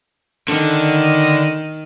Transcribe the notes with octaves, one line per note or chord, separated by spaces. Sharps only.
D3 D#3